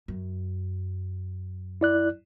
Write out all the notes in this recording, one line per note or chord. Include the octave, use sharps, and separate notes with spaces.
F#2
E4 D5 F#6